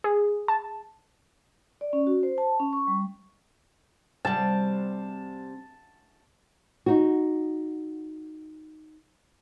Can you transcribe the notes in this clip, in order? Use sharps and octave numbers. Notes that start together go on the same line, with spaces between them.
G#4
A5
D5
C#4
F#4
C5
A5
C#4
C#6
G3
C3 G3 A5
D#4 F#4